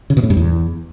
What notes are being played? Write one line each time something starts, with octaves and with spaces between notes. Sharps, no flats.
C#3
B2
A2
G2
E2